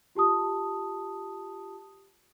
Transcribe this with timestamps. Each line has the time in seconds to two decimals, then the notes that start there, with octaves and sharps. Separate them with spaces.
0.15 F4 G4 A5 D#6